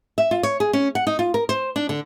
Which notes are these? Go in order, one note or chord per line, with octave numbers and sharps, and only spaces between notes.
E5
F4
C#5
G#4
C#4
F#5
D#4
F4
A#4
C5
D4
D3